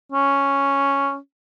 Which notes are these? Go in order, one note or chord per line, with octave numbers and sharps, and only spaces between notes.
C#4